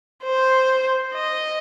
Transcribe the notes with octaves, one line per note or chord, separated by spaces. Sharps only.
C5
D#5